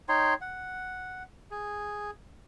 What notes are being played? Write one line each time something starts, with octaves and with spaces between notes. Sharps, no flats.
D#4 C#5 G5 C6
F#5
G#4